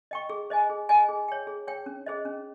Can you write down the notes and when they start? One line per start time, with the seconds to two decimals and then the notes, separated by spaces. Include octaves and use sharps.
0.11 D#5 G5 C#6
0.30 G#4
0.50 C5 D#5 G#5
0.70 G#4
0.89 C5 D#5 G#5
1.09 G#4
1.28 C#5 G5
1.47 G#4
1.67 C#5 G5
1.86 C#4
2.06 G#4 C5 D#5
2.25 C#4